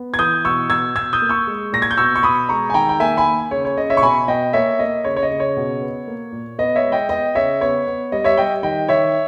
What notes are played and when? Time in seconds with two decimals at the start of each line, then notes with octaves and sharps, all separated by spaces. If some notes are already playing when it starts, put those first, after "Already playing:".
Already playing: B3
0.14 G#6
0.19 E3 D#6 G6
0.45 B2 C#6 E6
0.70 B2 E6 G#6
0.95 B2 E6 G#6
1.13 D#6 G6
1.22 A#3
1.29 C#6 E6
1.47 G#3
1.72 A#2 A#6
1.82 G#6
1.91 G6
1.97 B2 C#6 E6
2.16 C#6
2.23 B2 B5 D#6
2.49 G#3 A#5 C#6
2.70 G#5
2.74 D#3 G5 A#5
2.89 G5
3.00 A#3 E5 G#5
3.17 G#5 B5
3.26 A#3
3.51 C#3 C#5
3.65 C#5
3.77 C#3 D#5
3.90 C#5 E5
3.97 C#6
4.02 B2 G#5 B5
4.28 B2 D#5 G5
4.53 A#3 C#5 E5
4.79 A#3 D#5
5.04 C#3 C#5
5.16 C#5
5.23 D#5
5.31 C#3
5.40 C#5
5.57 B2
5.82 B3
6.07 A#3
6.32 A#2
6.59 B3 D#5
6.76 C#5 E5
6.84 G#3
6.92 D#5 G5
7.09 B3 D#5 G5
7.35 C#3 C#5 E5
7.61 B3 C#5
7.87 B3
8.12 G3 D#5
8.24 C#5 E5
8.37 G3 D#5 G5
8.63 D#3 D#5 G5
8.88 D#3 C#5 E5